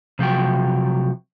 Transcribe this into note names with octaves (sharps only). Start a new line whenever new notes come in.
C3 F3 F#3 G5